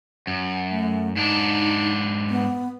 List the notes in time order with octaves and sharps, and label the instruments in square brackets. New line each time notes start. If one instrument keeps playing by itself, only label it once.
[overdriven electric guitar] F#2
[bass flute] A3
[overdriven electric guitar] G#2 D4 [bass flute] D#4
[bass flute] B3